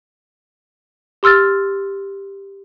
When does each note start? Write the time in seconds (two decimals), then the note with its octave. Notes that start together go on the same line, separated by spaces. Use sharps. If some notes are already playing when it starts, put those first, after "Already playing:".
1.23 G4 C6 E6 F6 A6